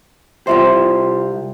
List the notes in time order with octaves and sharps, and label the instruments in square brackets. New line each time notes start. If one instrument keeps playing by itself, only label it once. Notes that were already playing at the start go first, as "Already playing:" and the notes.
[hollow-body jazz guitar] C3 G3 C5 [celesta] F4 E5 C6